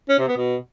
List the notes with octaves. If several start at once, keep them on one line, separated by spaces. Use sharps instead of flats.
C#4
C3
B3
B2